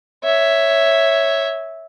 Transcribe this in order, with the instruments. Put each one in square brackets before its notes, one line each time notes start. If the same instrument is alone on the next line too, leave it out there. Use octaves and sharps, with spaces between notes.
[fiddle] C#5 E5